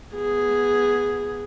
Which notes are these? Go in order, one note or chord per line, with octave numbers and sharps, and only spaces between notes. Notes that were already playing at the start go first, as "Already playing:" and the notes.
B3 G#4